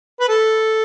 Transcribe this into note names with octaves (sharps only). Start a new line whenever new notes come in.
B4
A4